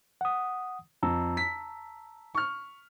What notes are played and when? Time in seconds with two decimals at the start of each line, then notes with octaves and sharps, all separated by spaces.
0.21 F#5 D#6
1.03 F2 A5 A#5 E6
1.37 B6
2.35 C#6 F6